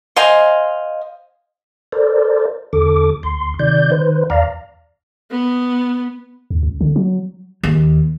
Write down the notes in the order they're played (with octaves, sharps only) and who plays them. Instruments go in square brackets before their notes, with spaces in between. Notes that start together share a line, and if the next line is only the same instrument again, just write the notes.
[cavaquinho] C5 D#5 F5 G#5
[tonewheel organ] A4 A#4 C5 D5
E2 D3 A4 D6
D2 C6
C3 D#3 D5 G6
D#3 B4 C5
E2 D5 F5 A#5
[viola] B3
[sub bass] D#2
C#2
D3
F#3
[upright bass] D#2